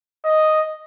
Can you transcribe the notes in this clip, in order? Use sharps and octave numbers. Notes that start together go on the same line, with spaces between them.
D#5